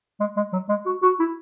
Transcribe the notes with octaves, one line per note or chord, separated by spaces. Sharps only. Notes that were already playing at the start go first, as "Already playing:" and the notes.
G#3
G#3
F#3
G#3
F#4
F#4
E4